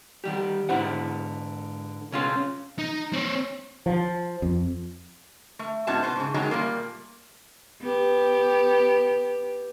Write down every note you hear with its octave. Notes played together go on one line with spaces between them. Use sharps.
D#3 G3 G4
G#2 D3 E4 C5 F#5
B1 C#3 C#4 F4 C6
D#4
C4 C#5
F3
F2
A3
G#2 B3 C#4 E4 F#4 A5
B2 B3 C5
G#2 C#3
F#2 D#3 F#3 G#3 A#5
A#2 G3 A3 A#3
B3 G4